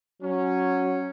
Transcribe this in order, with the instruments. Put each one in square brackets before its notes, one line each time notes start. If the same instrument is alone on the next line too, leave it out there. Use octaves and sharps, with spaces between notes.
[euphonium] F#3 [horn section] C#4